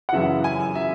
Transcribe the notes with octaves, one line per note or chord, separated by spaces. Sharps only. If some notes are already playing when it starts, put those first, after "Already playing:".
F#5
F#2 C#3 E3 E5
G#5
E5